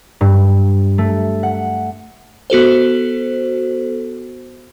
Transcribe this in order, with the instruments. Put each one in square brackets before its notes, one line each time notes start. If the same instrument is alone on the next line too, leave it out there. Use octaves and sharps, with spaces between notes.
[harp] G2
A3
F#5
[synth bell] B3 F#4 A4 C5